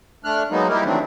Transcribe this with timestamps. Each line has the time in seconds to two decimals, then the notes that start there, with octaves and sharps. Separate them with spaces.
0.25 A3 D4 F6 F#6
0.51 F#3 G#3 A#3 B3 D#4
0.69 G3 A#3 D#4 E4 G4 A#4
0.84 D#3 E3 F#3 A3 C4 D4